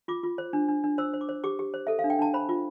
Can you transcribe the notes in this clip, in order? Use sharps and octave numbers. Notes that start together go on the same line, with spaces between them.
F4 D6
F4
C5
D4
D4
D4
C5 E6
C5
D6
C5
G4 D6
G4
C5
A4 E5
F5
D4
G5
D4 A5
C5 B5
F4